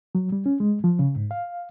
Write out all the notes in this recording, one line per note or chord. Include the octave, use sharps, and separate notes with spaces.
F#3
G3
C#4
G#3
F3
C#3
G#2
F5